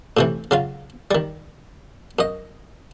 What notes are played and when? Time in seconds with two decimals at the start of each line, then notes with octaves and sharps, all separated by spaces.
0.17 A2 C3 E3
0.51 C#3 F#3 F4
1.11 D#3 G3
2.19 F#2 D#5